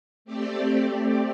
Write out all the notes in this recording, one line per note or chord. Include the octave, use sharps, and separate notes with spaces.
A3 C4 G4 D5